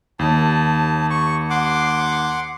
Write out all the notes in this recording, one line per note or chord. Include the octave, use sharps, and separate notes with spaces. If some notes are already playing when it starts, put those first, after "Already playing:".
D#2 A5
C#6
F#5 C6 D6